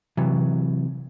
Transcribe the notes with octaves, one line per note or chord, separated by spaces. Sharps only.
C3 E3 F#3